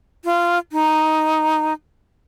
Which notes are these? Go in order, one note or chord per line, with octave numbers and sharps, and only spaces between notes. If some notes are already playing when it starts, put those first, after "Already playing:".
F4
D#4